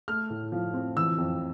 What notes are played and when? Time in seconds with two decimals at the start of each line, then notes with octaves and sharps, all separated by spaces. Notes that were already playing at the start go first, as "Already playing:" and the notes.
0.08 A3 F6
0.30 A2
0.52 F3
0.74 C4
0.97 E3 E6
1.18 F2